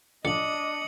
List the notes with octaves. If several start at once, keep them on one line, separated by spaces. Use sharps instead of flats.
A1 F3 D4 D5 D#5 D#6 C#7 F#7